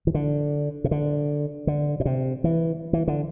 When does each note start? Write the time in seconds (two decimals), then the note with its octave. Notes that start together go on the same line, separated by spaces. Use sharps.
0.07 E3
0.14 D3
0.84 C3
0.91 D3
1.67 D3
2.00 B2
2.05 C3
2.44 E3
2.93 E3
3.08 D3